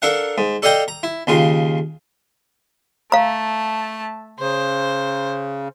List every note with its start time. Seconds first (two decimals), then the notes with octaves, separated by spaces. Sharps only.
0.02 D4 A4 A#4 F5 F#5
0.38 G#2
0.62 A4 D5 D#5 F5 G5 A#5
0.88 A#5
1.03 E4
1.27 D#2 C#3 F4
3.12 A3 F5 A5 A#5
4.39 C#3 C5